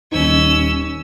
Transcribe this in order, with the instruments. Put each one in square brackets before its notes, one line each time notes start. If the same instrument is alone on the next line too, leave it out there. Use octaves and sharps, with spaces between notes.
[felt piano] D#1 D#4 [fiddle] C#4 E6